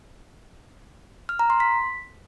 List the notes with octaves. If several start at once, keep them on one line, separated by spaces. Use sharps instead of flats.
F6
A#5
C6
B6